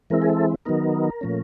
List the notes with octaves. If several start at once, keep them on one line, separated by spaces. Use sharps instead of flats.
E3 G#3 C4 E4 A#4
G#4
A4
D#3 F#3 B3 D#4 A#4
A#2 F3 A3 C#4